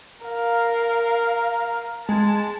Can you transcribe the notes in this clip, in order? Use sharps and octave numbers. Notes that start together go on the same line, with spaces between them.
A#4 F5
G#3 A5